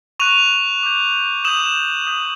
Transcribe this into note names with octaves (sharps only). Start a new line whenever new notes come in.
C#6 F#6 D#7 F7
D6 G6
D#6 G6 E7 F#7
D#6 G6